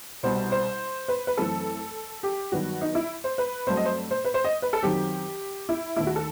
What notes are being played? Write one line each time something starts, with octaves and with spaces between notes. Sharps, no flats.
C2 B2 G3 C5
C5
B4
B4
F#2 E3 A3 C4 A4
G4
G2 D#3 F#3 B3 F#4
D#4
E4
C5
B4
G2 F#3 A3 C4 C5
D#5
C5
C5
B4
C5
D#5
B4
A4
F#2 D#3 F#3 C4 G4
E4
D#2 D#3 A3 E4
F#4
A4